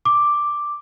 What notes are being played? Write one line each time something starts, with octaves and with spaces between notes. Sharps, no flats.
D6